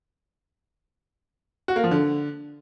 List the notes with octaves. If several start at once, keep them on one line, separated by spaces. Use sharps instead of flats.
F#4
A#3
F3
D3